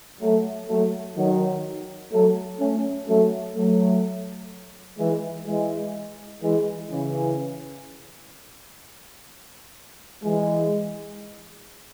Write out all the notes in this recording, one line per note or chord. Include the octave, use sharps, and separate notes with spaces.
F#3 A3
F#3 A3
D#3 F#3
F#3 A3
A3 C#4
F#3 A3
F#3 A3
E3 G#3
E3 G#3
E3 G#3
C#3 E3
E3 G#3